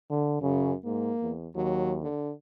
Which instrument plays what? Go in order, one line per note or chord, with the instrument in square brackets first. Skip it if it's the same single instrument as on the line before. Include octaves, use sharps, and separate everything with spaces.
[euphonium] D3
[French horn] F#2 [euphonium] C#3
[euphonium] G#2 [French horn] A#3
[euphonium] E2
[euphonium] D#2 [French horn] F#3
[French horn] D3